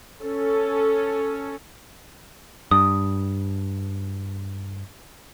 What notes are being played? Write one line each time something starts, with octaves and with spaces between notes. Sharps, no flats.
C#4 A4
G2 D#6